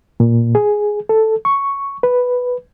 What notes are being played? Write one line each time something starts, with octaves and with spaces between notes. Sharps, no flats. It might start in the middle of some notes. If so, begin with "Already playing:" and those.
A#2
G#4
A4
C#6
B4